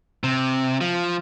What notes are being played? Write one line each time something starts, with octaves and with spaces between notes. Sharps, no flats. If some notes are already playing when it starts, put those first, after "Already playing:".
C3
F3